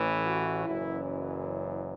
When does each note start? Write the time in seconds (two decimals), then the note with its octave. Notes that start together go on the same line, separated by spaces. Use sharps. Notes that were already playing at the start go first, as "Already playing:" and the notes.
Already playing: A1 A2 E3
0.26 F#4
0.65 F#1 F#2 E3 E4